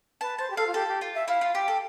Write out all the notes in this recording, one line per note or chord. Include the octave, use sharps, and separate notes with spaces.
B4 A5
C5 A5
G4
A4 F5
F4
G4 A4
G4
F4
E5
E4 F5
F4
G4 G5
A4